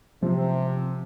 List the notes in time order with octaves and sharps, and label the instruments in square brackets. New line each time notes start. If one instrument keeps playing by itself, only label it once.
[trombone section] C3 [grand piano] F3